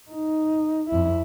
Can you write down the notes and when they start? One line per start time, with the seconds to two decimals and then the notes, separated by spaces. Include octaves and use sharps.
0.11 D#4
0.90 F2 E4